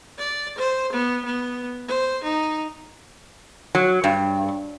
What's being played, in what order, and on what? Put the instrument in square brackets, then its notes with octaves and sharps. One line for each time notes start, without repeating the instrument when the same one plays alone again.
[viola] D5
C5
B3
B3
C5
D#4
[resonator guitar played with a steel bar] F#3
G2